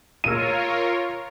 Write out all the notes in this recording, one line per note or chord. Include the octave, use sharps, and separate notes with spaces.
F4 A#4 C#5 E6 D#7